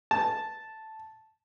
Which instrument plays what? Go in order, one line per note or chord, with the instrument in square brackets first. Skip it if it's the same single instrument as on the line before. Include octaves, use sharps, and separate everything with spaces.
[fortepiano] A5